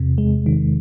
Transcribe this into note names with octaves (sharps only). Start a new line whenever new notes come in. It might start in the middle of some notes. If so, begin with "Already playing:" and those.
Already playing: E2 C3
G#3
D#3